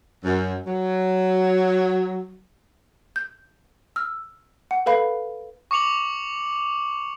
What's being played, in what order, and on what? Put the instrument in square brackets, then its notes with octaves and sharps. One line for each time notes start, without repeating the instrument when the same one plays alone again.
[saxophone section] F#2
F#3
[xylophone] G6
E6 F6
F#5
A4 B4 F5 B5
[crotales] C#6 D6 C#7 F7 F#7